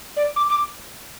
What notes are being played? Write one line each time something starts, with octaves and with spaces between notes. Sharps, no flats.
D5
D6
D6